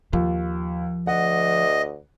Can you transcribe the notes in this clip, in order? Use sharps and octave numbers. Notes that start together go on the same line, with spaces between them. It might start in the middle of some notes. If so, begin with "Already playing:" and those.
D#2 F3
D2 D#5 F#5